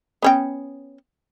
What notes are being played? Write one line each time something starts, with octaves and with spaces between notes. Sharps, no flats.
B3 C#4 G5